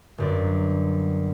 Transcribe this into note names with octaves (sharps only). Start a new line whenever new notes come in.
G1 F#2 D5